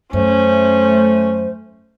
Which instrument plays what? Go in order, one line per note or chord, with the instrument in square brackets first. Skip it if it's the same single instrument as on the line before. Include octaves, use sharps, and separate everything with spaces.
[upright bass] F#2 [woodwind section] A3 [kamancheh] C#4 [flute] C5